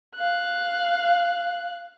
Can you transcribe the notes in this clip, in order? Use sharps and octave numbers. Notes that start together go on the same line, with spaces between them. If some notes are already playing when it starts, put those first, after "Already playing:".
F5 F#6